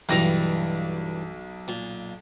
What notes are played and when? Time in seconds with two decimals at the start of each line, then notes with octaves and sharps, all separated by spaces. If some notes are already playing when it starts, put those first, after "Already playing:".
0.09 B1 G2 E3 G3 A#6 F7
1.68 A#2